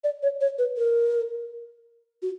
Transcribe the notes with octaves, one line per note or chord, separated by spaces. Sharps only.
D5
C#5
C#5
B4
A#4
F#4